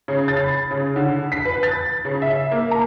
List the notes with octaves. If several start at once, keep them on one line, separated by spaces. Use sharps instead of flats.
C#3
A6
B5
C#3
D3
B6
B4
A6
C#3
E5
A#3
A#5